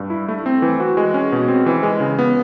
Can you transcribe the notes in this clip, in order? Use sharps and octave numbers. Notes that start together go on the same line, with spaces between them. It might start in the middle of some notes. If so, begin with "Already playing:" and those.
Already playing: G2
E4
A3
C4
E3
F#4
G#3
C#4
B2
C4
E3
G#3
C#3
B3